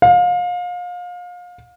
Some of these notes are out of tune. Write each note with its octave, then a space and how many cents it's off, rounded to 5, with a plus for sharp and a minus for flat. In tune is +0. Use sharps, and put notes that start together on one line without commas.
F5 +30